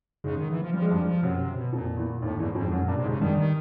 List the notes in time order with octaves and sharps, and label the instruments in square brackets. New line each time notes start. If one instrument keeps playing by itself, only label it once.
[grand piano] G#2 G#3 [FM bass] C#3
[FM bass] D#3
E3
F3
[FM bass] F3 [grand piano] G3
[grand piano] G#3
[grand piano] G2 G3 [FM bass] F3
[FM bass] F3
[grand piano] F#2 F#3 [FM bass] C3
[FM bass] C3
B2
[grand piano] F2 F3 [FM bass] A#2
[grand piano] E2 E3
[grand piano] D#2 D#3 [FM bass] A2
[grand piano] E2 E3 [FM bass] G#2
[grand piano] F2 F3 [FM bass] G#2
[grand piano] F#2 F#3
[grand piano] G2 G3 [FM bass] A#2
[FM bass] C3
[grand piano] G#2 G#3
[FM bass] C#3
[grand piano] G2 G3 [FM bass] D#3
[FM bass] D#3